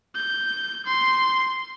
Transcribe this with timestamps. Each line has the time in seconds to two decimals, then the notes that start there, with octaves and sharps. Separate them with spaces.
0.15 G6
0.86 C6